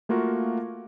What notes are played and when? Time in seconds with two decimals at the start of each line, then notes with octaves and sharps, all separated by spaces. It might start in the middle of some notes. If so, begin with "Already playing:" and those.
0.09 A3 A#3 F4 F#4 A#4